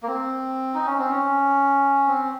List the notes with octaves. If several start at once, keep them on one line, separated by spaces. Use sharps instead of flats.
A#3
C4
D#4
C#4
C4
C#4
C4